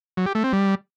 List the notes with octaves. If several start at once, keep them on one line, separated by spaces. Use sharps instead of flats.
F#3
G4
A3
C4
G3